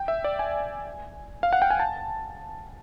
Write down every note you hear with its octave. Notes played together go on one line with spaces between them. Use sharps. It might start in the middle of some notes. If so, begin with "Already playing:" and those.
Already playing: G5
E5
D5
G#5
F5
F#5
G5
G#5
A5